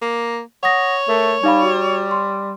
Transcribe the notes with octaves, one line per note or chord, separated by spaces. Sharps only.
A#3
C#5 F#5 D#6 A#6
A3 A#4
G3 D#4 F5 B5
F#4
C6